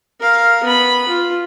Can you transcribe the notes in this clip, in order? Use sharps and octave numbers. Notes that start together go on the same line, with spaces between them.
A#4 F5
B3 B5
F4